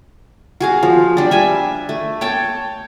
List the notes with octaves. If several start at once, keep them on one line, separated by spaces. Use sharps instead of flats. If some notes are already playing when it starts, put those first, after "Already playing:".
F#4 G#4 F5
F3
G3 D4
E5 G#5
A3
C#5 G5 A5